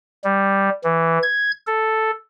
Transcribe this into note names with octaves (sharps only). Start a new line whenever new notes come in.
G3
E3
G#6
A4